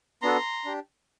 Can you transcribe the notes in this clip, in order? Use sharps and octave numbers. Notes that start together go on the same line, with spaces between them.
B3 D4 F#4 A4 A#5 C6
D4 G4